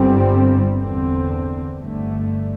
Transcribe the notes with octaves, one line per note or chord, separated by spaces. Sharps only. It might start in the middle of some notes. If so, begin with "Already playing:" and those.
Already playing: G1 G2 G3 C4
E2 D3 C4
G1 G2 D3 A3